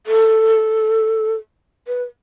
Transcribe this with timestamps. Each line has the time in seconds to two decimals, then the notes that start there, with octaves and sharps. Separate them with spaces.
0.07 A4
1.87 B4